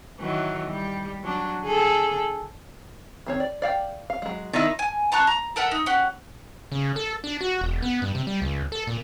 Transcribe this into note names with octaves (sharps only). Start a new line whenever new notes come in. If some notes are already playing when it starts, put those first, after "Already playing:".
D#3 E3 F#3
G3
F#3 D4
D3 G#4 A4
D#3 C4 C#5
D5
D5 F5 G5
F5
F#3 G#3
D#3 D#4 E4
G#5
A5 A#5 C#6 F#6
A#5
A4 A#4 E5 F#5
D#4
C#4 G4 F#5
C#3
A4
D4
F#4
E1
B3
G2
C3
G3
C#2
A4
A#2